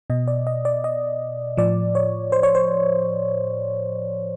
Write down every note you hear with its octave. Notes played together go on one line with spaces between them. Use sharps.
B2 D#5
D5
D#5
D5
D#5
A2 F3 D5
C#5
C5
C#5
C5